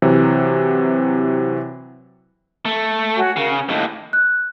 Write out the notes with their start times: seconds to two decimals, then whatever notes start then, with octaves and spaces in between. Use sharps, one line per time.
0.02 C3 E3 F#3
2.65 A3
3.17 F#4 C#5 G#5
3.37 C#3 A#4
3.50 C#4
3.69 D#2 A2 D#5
4.13 F#6